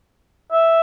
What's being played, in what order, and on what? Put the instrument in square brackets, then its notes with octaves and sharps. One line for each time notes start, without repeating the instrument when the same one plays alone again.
[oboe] E5